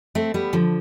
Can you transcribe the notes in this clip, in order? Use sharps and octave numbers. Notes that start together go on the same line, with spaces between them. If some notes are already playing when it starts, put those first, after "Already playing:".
A3 C4
G3 B3
D3 F3